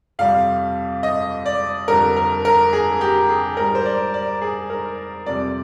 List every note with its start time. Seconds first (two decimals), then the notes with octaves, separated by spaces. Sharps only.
0.19 F2 C3 G3 F5
1.03 D#5
1.46 D5
1.88 F2 D3 G3 A#4
2.16 A#4
2.45 A#4
2.73 G#4
3.01 G4
3.29 G#4
3.57 G#2 G3 A#4
3.75 C5
3.86 D5
4.14 D5
4.42 G#4
4.70 A#4
5.26 F2 C3 G3 D5